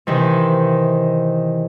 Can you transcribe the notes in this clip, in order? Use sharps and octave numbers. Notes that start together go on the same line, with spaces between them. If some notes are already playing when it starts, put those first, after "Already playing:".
C3 D#3 E3